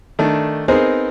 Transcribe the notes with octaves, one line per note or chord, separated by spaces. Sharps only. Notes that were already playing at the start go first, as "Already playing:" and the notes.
D#3 A3 D4
B3 C4 D#4 G#4 A#4 C5